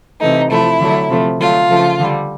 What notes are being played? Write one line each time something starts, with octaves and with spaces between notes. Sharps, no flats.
C3 E3 A3 D#4
C3 F3 A3 E4
D3 F#3 A3
C3 F3 A3
D3 F#3 A3 F4
C#3 F3 A3
D3 G3